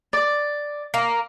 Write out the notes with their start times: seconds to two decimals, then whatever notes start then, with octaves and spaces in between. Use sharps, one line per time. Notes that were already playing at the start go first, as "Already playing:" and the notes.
0.13 D5
0.94 A#3